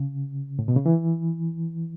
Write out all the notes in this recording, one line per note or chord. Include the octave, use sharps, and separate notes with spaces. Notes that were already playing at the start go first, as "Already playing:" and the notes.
Already playing: C#3
A2
B2
C#3
E3